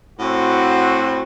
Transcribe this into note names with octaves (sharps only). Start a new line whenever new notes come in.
A2 C4 F#4